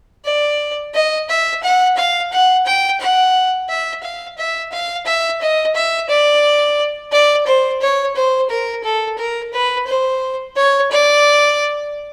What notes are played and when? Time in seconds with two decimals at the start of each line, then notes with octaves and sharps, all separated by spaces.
0.25 D5
0.94 D#5
1.29 E5
1.63 F#5
1.97 F5
2.32 F#5
2.66 G5
3.00 F#5
3.69 E5
4.03 F5
4.38 E5
4.72 F5
5.06 E5
5.41 D#5
5.75 E5
6.09 D5
7.12 D5
7.47 C5
7.81 C#5
8.16 C5
8.50 A#4
8.84 A4
9.18 A#4
9.53 B4
9.87 C5
10.56 C#5
10.91 D5